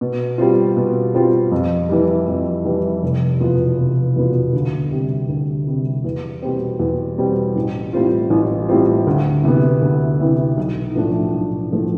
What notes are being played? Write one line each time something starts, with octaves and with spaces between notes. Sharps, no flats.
B2
G3 C4 F4
B2
G3 C4 F4
F2
E3 G3
F2
E3 G3
F1
E2 B2 B3 F4
F1
E2 B2 B3 F4
D2
C3 G3
D2
C3 G3
E2
B2 G3 C4
E2
B2 G3 C4
A1
A2 G3 C4 F4
A1
A2 G3 C4 F4
D2
C3 E3 B3 E4
D2
C3 E3 B3 E4
B1
A2 F3 A3 D4
B1
A2 F3 A3 D4